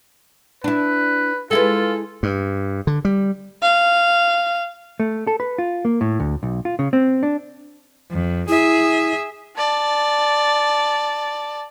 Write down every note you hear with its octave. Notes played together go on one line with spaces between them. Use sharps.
D4 E4 B4
G#3 E4 F4 A4 B4
G2
D3
G3
F5
A3
A4
B4
F4
A#3
A2
D2
B1
F4
C#3
C4
D4
F2
E4 G#4 E5
D5 A5